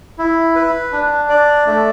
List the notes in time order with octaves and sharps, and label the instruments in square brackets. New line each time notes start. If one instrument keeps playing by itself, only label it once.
[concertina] E4
B4
D4
D5
A3